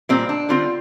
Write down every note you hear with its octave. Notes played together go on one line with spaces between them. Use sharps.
A#2 G3 A#3 C4
D4
D3 G3 C4 F4